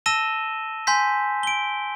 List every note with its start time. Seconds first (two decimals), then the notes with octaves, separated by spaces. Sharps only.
0.06 A5 E6 A#6 D#7 E7 G7
0.87 G#5 C6 G6 B6
1.43 D7 G7